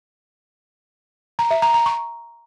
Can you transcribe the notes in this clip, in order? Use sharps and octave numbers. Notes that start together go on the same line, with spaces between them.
A#5
E5
A#5
A#5
C#6